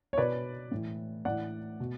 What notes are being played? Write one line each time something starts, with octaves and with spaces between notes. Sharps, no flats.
C#5
B2 B4 D5
A2 E3
A2 E3 D5 F#5
B2